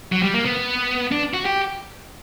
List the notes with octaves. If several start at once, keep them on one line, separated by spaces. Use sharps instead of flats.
F#3
G3
A#3
B3
D4
F#4
G4